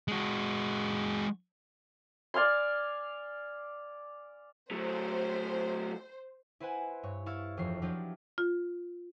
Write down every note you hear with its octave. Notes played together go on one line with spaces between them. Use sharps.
G#3 F#4
D5 F5 G#5 C6
F#3 A3 C5
E4 B4 C5 F#5 G#5
G2 C#5
E4 F5 C#6 E6 A6
E1 F2 F3 C#5 C7
F3 F#3 D4 E4 F4 G4
F4